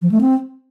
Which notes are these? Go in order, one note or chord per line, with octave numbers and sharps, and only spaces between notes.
F3
A3
C4